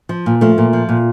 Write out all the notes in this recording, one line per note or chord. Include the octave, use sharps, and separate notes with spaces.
F3
A#2
F3 A3
A#2
F3
A#2